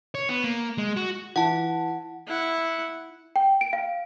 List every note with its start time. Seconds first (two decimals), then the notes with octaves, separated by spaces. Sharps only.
0.15 C#5
0.29 B3
0.44 A#3
0.78 G#3
0.97 F#4
1.36 E3 F#5 A5
2.27 E4 F#5
3.36 G5
3.61 D7
3.73 F5